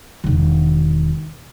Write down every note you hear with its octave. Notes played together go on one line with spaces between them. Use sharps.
E1 D#3